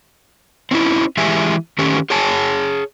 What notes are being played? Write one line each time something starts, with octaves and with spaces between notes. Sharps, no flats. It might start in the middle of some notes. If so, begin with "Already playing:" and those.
C4 C#4 D#4 E4
E3 G#3 G4 E5 G#5
D#3 A3 C#4 G4
G#4 C#5 G#5 A5